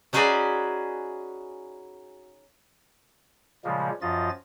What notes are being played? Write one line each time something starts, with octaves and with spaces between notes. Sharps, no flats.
C#4 D#4 F#4 G#4 B4 D5
A#2 C#3 F3 G3 G#3 A#3
F#2 F3 F4 D#5 A6